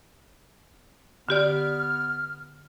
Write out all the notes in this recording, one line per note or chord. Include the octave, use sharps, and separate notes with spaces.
D3 B3 G4 D5 F6